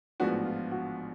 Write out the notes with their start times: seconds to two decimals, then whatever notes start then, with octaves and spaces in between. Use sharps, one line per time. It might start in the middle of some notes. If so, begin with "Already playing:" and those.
0.20 A1 G#2 F3 B3 D4 F#4
0.45 F4
0.71 F#4